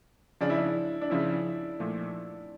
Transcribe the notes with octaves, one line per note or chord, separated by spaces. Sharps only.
C#3 F3 C#4 D4
E4
D4
D4
C#3 F3 C#4 E4
A#2 F3 A3